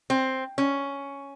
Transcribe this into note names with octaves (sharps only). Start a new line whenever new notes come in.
C4
C#4